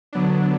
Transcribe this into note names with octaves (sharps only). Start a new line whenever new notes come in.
D3 F#3 B3 D4
D3